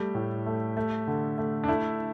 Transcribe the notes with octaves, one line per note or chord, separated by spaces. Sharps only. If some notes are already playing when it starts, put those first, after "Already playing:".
Already playing: G3 A3 G4
A2
A3
A3
D3
A3
D4
A3 E4